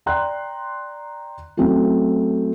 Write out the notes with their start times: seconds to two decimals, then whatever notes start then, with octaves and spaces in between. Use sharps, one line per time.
0.06 D5 G5 A#5 C6 F#6
1.57 F#3 A3 C4 C#4 E4 F#4